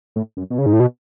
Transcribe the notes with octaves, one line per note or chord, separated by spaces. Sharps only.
A2
F#2
B2
C#3
G#2
A2
B2